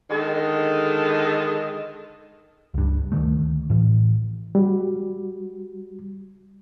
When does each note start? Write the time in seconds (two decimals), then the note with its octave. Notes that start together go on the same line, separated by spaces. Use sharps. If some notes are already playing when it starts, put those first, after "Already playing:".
0.11 D3 D#3 G#3 A4
2.74 C#2 G2
3.12 D2 D#3 F3 A3
3.70 A2 E3
4.55 G3 F#4